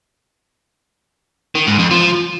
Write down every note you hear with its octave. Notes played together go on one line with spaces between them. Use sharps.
D#3
G#2
F2
F3